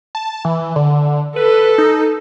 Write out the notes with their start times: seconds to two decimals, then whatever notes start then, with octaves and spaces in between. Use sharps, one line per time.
0.15 A5
0.45 E3
0.76 D3
1.36 A4 B4
1.78 D#4